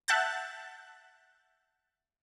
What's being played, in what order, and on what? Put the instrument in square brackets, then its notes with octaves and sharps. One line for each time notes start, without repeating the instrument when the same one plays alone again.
[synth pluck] E5 F#5 A5 F#6 G6 A6